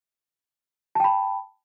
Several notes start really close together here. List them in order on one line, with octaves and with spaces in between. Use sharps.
A5 G5 B5